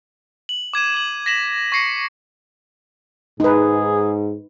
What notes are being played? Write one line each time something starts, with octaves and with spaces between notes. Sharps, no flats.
F#7
D6 G#6 D#7 E7
D6 F#7
A#6 B6 E7 F#7
C#6 A#6 C7 C#7
G#2 D#4 G#4 B4